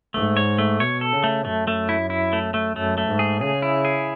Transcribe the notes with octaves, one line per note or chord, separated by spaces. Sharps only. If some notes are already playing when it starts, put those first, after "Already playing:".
G#2 A3
C#5
A3
B2 C#5
A4
C#3
A3
F#2 A3
A3
E4
E4
A3
A3
F#2 A3
A3
G#2
G#4
C#3 G#4
E4
G#4